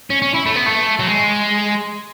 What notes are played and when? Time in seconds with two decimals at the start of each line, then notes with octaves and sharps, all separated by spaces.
0.10 C#4
0.22 C#4
0.34 E4
0.46 A3
0.56 B3
0.66 A3
0.99 F#3
1.06 G#3